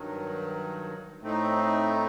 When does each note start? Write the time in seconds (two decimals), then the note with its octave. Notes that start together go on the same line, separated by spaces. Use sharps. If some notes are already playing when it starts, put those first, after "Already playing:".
Already playing: G2 D#3 F#3
1.21 A2 A3 C4 D#4